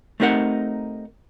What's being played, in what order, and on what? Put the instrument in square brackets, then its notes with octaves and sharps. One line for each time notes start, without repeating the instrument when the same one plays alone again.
[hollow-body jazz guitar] A3 C4 D#4 G4 A#4 F#5